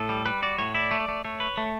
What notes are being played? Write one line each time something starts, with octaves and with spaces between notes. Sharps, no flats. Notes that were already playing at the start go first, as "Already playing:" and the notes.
Already playing: A2 A4
G3
G3 B4
F#4 D5
A2 C#5
E4 D5
A3
D5
A3
A3 C#5
B4
A3